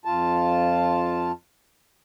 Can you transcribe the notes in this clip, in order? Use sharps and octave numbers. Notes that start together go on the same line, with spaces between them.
F2 F4 A5